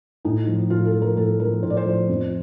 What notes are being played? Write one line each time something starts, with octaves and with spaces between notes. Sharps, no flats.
A2 D#4
F3
A2 F4
A4
F3
A#4
A2 A4
F3 A#4
A2 C5
D5
C5
F3
F2